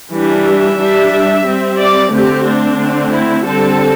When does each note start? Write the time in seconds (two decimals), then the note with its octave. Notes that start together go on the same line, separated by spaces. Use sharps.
0.13 E3 G3 D4
0.46 E5
0.80 G3 D4
1.46 G3 C4
1.79 D5
2.13 D3 A3 C4 G4
2.45 D4
2.78 D3 A3 C4
3.13 E4
3.45 D3 G3 C4 A4